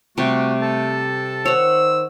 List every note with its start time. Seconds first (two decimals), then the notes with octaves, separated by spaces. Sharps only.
0.18 C3 G3 A3 F#4
0.61 A4 A5
1.46 D#3 C5 C#5 F#5 E6